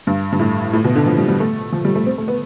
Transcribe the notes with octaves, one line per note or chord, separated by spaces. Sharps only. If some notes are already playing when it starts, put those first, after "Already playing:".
G2
G2
A2
A2
B2
D3
F3
G3
G3
A3
F3
G3
A3
C4
A3
B3